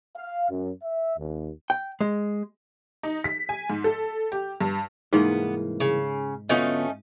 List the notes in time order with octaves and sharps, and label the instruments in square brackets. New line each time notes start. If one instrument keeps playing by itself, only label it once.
[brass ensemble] F5
F#2
E5
D#2
[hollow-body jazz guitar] G5
G#3
[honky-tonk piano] D#4
B6
G#5
G#2
A4
G4
G2
[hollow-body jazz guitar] C2 E3 A#3 [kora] G#2 [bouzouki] B3
[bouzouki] C#3
[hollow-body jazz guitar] D2 B3 F4 [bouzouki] A3 C#4 D#4